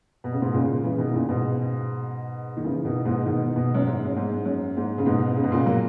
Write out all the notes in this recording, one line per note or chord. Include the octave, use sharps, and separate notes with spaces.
B2
C#3
G#2 B2
A#2 C#3
C#3 E3
B2 D#3
A#2 C#3
G#2 B2
D#3
C#3 E3
B2 D#3
G#2 B2
B2 D#3
B2 D#3
F#2
G#2
F#2
G#2
F#2
G#2
C#3
G#2 B2
C#3
B2
A#2 C#3
F#3 A#3